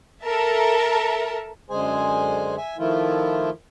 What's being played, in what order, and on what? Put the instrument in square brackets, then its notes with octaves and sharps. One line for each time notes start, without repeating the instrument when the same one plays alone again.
[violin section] A4 A#4 E5 A5
[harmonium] F#2 D3 G#3 G#4 C5 G#5
E5 G#5
D#3 F3 A3 E4 F4